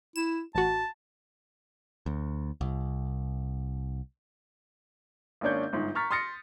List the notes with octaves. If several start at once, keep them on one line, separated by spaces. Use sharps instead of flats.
E4 E7
A1 F#4 A5
D2
C2
G#1 A#3 C#4 D4 C#5 G6
G1 G#2
A#5 C#6 F6 A6 B6
C6 D#6 F6 A6 A#6 C#7